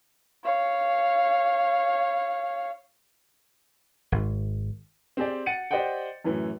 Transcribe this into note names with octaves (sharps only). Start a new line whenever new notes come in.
C#5 F5
G#1
C4 G4 G#4 D5
F#5 A6 C#7 D#7
G4 C5 D5 D#5 F#5 G5
F#2 A2 E3